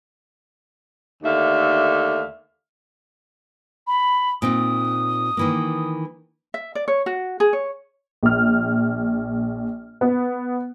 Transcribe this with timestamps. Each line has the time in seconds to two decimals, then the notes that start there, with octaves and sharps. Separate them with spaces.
1.23 D#2 D3 A3 E5 F5
3.87 B5
4.42 A#2 C4 D#4 D#6
5.37 D#3 E3 A#3
6.54 E5
6.75 D5
6.88 C#5
7.06 F#4
7.40 G#4
7.53 C#5
8.23 A#1 F6
10.01 B3